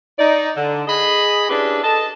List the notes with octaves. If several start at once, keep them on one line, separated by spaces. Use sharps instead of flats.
D#4 D5
D3
G#4 D#5 B5
C#4 D4 E4 G4 G#4 B4
A4 D#5 A5